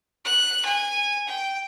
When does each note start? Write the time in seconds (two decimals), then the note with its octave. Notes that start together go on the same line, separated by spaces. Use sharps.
0.25 F#6
0.65 G#5
1.28 G5